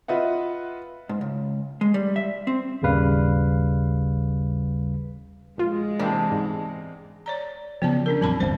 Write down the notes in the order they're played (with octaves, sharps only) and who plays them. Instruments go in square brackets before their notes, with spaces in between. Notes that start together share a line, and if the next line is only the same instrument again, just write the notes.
[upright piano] F4 B4 D#5 E5 F#5
[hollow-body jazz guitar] G#2
C#2
G#3
G3
E5
C4
[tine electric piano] G#1 D#2 C#3 G3 B4 F5
[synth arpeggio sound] A#1 F4 [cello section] G#3
[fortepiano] E2 C3 [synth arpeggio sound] A#3 C4 [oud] D4
[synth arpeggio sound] G#2
[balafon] C#5 D5 A#5
[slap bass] C#3 F3 [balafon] B3 D5 A5
[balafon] C#4 D4 A#4
[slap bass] E2 A2 F#3 [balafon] C4 A5 B5
[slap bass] D1 G1 G3 [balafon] C5